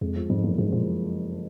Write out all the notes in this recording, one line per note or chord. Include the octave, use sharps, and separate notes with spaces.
F2 G#3
F3
F2 G#2
F#1
G#2 G#3
A#2 F3